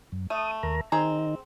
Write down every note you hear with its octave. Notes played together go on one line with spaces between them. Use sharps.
F#2
A3 D#6
D#2 A#4 A#5
D#3 C4 D#4 G#4 A#5